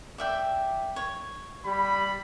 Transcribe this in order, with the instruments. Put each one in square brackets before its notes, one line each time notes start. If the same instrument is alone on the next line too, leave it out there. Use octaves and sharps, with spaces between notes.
[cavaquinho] D5 E5 G5
C#5
[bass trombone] G3 [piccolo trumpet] B5